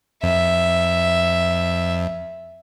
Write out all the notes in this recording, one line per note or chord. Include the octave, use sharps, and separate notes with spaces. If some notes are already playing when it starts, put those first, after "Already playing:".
F2 E5